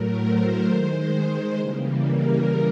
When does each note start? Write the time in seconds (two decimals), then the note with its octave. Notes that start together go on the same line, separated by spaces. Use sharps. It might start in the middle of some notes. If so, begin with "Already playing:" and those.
Already playing: A2 F#3 A3 A#4
0.22 C5
0.67 D#3 G#3
1.57 C#3 E3 G3 A#3
2.03 A#4